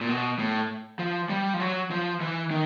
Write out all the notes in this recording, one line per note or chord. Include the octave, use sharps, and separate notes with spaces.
A#2
B2
A2
F3
G3
F3
F#3
F3
E3
D#3